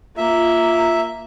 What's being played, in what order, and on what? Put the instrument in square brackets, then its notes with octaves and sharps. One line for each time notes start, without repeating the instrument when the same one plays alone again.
[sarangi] A#3 [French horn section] F4 [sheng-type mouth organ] E5